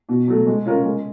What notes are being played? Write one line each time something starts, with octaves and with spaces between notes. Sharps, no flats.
B2
F#3 A3
G#3
C#4 F4 A#4
G#3